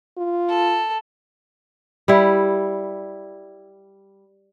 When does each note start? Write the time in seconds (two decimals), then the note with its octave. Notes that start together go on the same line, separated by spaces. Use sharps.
0.18 F4
0.48 A4
2.08 G3 E4